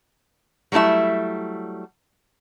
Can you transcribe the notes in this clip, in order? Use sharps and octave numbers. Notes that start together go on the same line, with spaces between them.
F#3 G3 A3 E4 E5